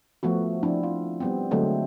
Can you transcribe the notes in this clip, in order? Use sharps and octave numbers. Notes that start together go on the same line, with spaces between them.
F3 A3 B3 F#4
F3 C4 D4 E4
F4
G3 B3 C4
D3 F#3 G#3 A3 C4